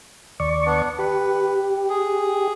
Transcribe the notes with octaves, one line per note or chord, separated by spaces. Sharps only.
D#2 D5 C#6
B3 D4
G4 B4
G#4